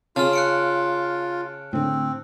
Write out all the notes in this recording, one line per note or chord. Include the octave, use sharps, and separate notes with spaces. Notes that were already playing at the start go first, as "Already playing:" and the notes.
C#3 F4 A5 F6
F#6 C#7 D7
A2 D3 C4